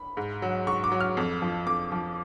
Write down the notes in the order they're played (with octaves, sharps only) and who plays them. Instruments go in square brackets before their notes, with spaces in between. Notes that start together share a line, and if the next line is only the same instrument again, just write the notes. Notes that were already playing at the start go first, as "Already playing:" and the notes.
Already playing: [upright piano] B5
G#2
F#3
G#2 C#6
D6
F#3
F6
F2
F3
F2 D6
F3